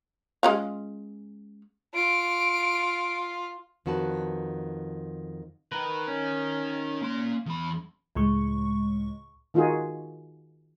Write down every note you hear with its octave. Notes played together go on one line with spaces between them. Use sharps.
G#3 C#4 F4
F4 D7
F2 D#3 F#4 B4 A5
D#4 A#4 B4
C#4
A#3 C6
E2 B5
C#2 A2 G#3 C#6
D#3 D#4 F4 F#4 G#4